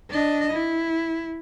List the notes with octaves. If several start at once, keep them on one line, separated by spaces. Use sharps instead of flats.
D4 D#5
E4